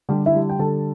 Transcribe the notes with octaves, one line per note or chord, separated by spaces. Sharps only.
D3 G3 G4
E4 E5
G3
G5
D3 A4 A5